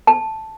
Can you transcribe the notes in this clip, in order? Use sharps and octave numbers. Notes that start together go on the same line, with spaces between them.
A5